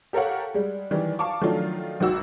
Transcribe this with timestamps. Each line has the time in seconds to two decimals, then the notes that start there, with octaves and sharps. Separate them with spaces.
0.13 G4 A4 A#4 C#5 F5 F#5
0.54 G3 G#3
0.91 D#3 E3 G3
1.19 F5 A5 C#6 D6
1.41 D#3 F3 F#3 A3 D4 F4
2.00 G#1 D#3 F#4 E6